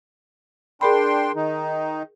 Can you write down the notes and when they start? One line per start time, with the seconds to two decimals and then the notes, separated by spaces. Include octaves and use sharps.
0.81 D4 G#4 A#4 G5 B5 C6
1.35 D#3 D#4